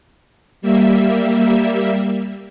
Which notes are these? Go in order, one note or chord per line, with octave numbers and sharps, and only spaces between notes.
G3 A#3 E5